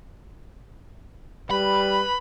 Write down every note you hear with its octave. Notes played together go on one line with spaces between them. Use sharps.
G3 B4 B5